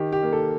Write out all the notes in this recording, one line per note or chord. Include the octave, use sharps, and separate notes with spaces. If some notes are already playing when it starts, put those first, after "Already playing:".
Already playing: D#3 G4
G4
A#3
A4